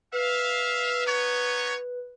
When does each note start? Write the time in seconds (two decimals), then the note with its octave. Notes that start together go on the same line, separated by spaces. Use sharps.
0.13 B4 E5 F5
1.05 B3 D#4 C#5